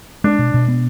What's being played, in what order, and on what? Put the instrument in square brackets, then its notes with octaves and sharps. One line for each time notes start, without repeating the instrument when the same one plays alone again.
[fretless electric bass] G#3 [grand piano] D4
[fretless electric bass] B2
B2
B3